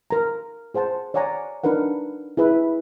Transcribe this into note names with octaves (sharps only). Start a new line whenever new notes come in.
A#4 A#5
G#4 C5 F#5 A5
C#5 D5 F#5 G#5 A#5
D4 D#4 A#4 B4 F#5
E4 G#4 B4 E5